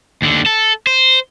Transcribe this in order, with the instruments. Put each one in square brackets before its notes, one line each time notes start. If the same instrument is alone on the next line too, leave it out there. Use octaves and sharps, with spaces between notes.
[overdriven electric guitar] D#2 D3
A4
C5